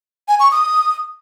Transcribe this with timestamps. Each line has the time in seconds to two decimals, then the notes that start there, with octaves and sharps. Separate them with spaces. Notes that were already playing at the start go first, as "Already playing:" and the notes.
0.28 G#5
0.40 C#6
0.51 D#6